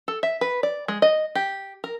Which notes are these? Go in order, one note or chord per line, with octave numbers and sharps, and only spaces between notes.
A4
E5
B4
D5
G#3
D#5
G4
A#4